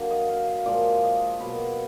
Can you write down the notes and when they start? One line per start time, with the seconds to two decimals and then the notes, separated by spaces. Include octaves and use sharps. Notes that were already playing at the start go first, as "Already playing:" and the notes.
Already playing: D3 F#3 A#3
0.11 D#5
0.29 F5
0.48 F5
0.66 A#2 F3 G#3 D5
1.04 D#5
1.40 B2 F#3 A#3 B4